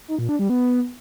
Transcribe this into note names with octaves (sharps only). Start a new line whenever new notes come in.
D#4
A#2
D4
G3
B3